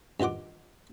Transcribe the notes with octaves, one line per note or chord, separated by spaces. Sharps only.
G2 D#3 F4 F#5 D6